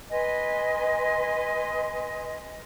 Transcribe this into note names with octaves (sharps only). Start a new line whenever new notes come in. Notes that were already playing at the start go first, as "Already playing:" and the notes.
B4 D#5 G#5 C6